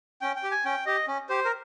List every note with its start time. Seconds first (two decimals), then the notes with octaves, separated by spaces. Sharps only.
0.21 C#4 G5
0.36 G5
0.43 G4
0.51 G#5
0.65 C#4 G5
0.86 G4 D#5
1.08 C#4
1.29 G4 C5
1.45 A#4